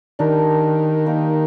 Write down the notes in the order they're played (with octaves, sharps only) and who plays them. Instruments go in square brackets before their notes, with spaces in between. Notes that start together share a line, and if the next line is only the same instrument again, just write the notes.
[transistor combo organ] D#3 [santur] D4 G4 A#4
[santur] A#3 D#4 G4